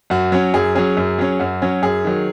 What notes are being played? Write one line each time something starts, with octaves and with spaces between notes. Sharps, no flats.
F#2 F#4
F#3 C#4
F#2 G#4
F#3 C#4 G#4
F#2
F#3 C#4
F#2 F#4
F#3 C#4
F#2 G#4
D#3 F#3